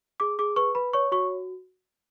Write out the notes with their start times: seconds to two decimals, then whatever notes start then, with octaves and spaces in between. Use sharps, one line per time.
0.20 G#4 D6
0.39 G#4 D6
0.56 B4 C#6
0.75 B4 B5
0.93 C#5 C#6
1.12 F#4 C#6